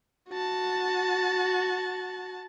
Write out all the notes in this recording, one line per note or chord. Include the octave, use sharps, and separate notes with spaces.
F#4 A5